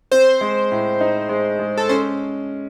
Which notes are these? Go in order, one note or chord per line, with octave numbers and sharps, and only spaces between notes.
C4 C5
G#3
A2
D#4
G#3
G#3
A4
C#4 C5